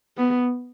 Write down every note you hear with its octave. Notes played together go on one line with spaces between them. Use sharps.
B3